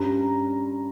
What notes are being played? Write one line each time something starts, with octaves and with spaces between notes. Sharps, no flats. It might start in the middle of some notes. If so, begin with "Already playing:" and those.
Already playing: G2 G3 C#4 A#5